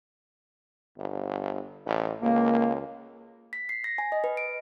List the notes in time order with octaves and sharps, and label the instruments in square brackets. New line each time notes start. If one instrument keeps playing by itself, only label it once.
[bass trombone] G1
A1
[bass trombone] C#2 [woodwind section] A#3
[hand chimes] B6
C7
A#6
G#5
D#5
B4
D7